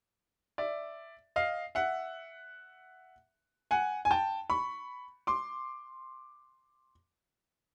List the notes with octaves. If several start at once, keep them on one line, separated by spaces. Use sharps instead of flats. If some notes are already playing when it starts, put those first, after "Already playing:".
D5 E5
D#5 F5
E5 F#5
F#5 G#5
G#5
G5 A5
B5 C#6
C6 D6